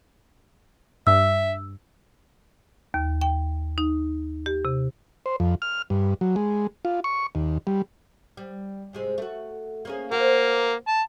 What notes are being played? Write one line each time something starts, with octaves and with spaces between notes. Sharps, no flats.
G2 E5 E6
D#2
G5
D#4
G4
C3
C5
F2
F6
G2
F#3
G#3
F4
C#6
D#2
G3
G3
G#2 C3 G#3
A3 F#4
A#3 C#4 G#4
A#3 F#4 C5
A5